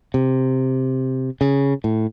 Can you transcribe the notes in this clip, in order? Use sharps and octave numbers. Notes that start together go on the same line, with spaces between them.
C3
C#3
A2